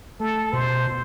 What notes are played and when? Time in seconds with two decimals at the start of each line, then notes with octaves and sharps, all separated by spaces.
0.20 A3 A4
0.52 B2 C5
0.86 B2